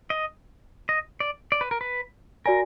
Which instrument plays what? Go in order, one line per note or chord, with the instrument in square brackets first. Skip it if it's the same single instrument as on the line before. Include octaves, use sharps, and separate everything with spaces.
[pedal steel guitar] D#5
D#5
D5
D5
B4
A#4
B4
[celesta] F#4 D5 G#5 [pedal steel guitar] A#4